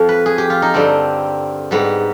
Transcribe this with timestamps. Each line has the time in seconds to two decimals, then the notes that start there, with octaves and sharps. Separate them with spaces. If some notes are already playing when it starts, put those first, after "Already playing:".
Already playing: F2 F3
0.09 B4
0.26 G#4
0.38 G4
0.50 F4
0.62 D#4
0.74 G2 D3 G3 C4
1.71 G#2 G3 B3